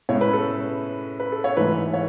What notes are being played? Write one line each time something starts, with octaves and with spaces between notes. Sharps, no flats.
A2 G#3 C#4 C#5
B4
A4
B4
A4
C#5
G#2 E3 A3 B4
C#5